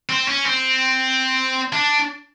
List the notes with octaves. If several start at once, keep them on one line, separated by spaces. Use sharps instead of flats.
C4
C#4
C4
D4